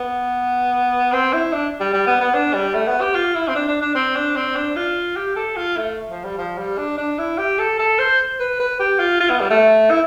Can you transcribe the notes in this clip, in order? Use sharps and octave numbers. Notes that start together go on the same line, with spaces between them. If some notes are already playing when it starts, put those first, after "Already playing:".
Already playing: B3
C4
E4
D4
G3
G3
B3
B3
D4
G3
A3
B3
G4
F4
E4
C4
D4
D4
D4
C4
D4
C4
D4
F4
G4
A4
F4
A3
F3
G3
F3
G3
D4
D4
E4
G4
A4
A4
C5
B4
B4
G4
F4
F4
B3
G3
A3
E4